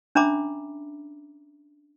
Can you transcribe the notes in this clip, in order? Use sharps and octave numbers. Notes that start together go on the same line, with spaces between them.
C#4 D4 E5 A#5 B5 D6